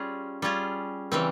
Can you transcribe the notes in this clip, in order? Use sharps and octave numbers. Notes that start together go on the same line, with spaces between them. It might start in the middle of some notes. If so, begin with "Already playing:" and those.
Already playing: G3 C#4 F4 G#4
G3 C#4 F4 G#4
C#3 E3 G3 C4